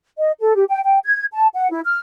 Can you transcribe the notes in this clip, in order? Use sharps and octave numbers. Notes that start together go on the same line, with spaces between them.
D#5
A4
G4
G5
G5
G#6
A5
F#5
E4
F6